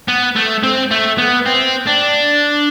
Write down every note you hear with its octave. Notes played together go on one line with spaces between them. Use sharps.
B3
A3
C4
A3
B3
C4
D4